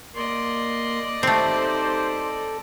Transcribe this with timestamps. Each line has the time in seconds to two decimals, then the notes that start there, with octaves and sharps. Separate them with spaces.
0.15 A#3 D5 D#5 C6
1.23 A3 C4 D#4 G4 A4 C5